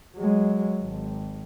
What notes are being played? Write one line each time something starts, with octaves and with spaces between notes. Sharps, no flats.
F#3 G#3
G#1